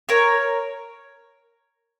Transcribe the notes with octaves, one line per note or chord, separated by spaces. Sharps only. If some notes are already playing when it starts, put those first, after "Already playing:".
A#4 C#5